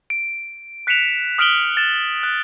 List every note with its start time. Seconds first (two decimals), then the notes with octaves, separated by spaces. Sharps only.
0.10 D7
0.87 F#6 B6 C#7 D7 E7 F7
1.38 D#6 F6 B6 D7 F#7 G7
1.76 F6 A6 E7
2.23 F#6